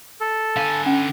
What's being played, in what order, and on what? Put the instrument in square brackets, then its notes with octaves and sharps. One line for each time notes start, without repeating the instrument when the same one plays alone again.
[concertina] A4
[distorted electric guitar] D3 G#5 [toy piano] F5
[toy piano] C#4